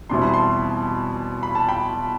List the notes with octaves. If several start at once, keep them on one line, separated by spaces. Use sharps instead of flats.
E2 B2 G3 C4 E4 C6
B5
A5 C6
B5
A5
G5 B5